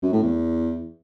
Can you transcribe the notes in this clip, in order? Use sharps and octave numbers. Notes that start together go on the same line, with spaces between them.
F#2
A2
E2